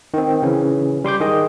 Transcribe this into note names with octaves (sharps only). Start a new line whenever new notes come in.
D#3 C4
C#3 E3 C#4
G3 C6 D6 G6
D#3 G#4 D#5